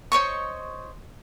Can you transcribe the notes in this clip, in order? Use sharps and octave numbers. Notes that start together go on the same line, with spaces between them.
C5 C#5 D#5 C#6